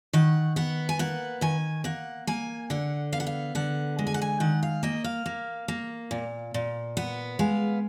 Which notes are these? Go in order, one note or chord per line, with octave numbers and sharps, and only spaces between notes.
D#3 F#5
B3 F#5
G#5
A#3 F#5
D#3 G#5
A#3 F#5
A#3 G#5
D3 F#5
B3 F5
F#5
F5
D3 F#5
G#3
G#5
F#5
G#5
D#3 F#5
F5
A#3 D#5
F5
A#3
A#3
A#2
A#2
B3 F#5
G#3 F5